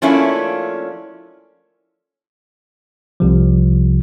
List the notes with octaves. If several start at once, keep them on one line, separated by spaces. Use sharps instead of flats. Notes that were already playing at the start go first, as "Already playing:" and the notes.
F3 A3 A#3 C#4 D4 E4
C2 C3 F3